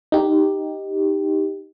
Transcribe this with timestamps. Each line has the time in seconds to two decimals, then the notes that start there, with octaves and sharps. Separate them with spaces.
0.12 D#4 G4